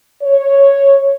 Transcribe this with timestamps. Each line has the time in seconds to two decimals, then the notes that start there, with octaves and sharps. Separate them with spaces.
0.23 C#5